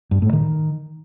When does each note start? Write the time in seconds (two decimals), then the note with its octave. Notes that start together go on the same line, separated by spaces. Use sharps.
0.11 G2
0.22 A2
0.33 D#3